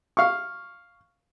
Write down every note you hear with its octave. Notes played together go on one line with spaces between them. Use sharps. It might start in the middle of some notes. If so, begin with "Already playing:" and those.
F5 C#6